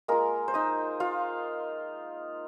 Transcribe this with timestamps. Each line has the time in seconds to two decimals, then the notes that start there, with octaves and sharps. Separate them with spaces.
0.08 G#3 A#3 F4 A#4
0.48 C5
0.54 D#4 D#5
1.00 F4 F5